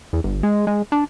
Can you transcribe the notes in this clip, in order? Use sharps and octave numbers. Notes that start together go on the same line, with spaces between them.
E2
G1
G#3
G#3
D4